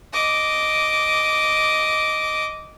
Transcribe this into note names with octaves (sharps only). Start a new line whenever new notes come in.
D#5 D6